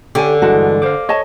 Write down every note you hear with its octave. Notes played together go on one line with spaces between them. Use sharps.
D3 C#4 G4 A4 G#5
G2 E3 G#3 F#4 F#5 A5
C5 D5 F5 D6
C#5 D#5 A5